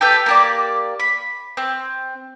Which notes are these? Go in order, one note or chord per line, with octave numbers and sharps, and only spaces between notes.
G4 A4 B4 G6
A#3 G4 D5
B5
C4